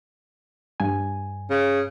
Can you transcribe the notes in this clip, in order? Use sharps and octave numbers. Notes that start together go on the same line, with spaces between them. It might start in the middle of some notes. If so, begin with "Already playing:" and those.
G2 G#5
C#3